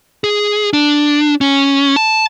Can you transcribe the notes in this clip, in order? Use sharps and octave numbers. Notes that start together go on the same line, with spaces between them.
G#4
D4
C#4
A5